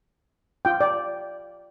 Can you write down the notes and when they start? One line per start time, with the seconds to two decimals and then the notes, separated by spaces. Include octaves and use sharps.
0.65 F4 G5
0.81 D5